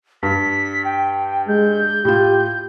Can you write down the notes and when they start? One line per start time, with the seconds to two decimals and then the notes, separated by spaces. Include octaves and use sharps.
0.23 G2 B6
0.85 G5
1.48 G#3 G6
2.05 A2 F4 G4